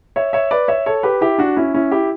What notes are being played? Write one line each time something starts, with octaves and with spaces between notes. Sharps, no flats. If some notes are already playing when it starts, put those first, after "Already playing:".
C#5 E5
C#5 E5
B4 D5
C#5 E5
A4 C#5
G4 B4
E4 G4
D4 F#4
C#4 E4
C#4 E4
E4 G4